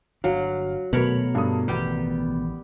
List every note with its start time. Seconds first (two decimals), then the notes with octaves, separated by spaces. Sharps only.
0.24 G1 F#3 D4 F5
0.93 D#1 B2 F#3 A3 A#4 B4 C#5 B5
1.35 G2 D4 A4 D#6
1.68 A1 D#3 G3 B3 G4